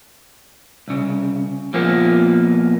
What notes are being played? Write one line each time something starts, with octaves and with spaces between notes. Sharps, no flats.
C2 C#3
A#2 F3 A#3 B3